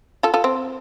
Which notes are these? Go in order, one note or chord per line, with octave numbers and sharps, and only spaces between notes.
F4 A4
F4 A4
C4